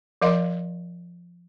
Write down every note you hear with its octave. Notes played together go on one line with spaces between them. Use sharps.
F3 A#4 D#5 F5 C6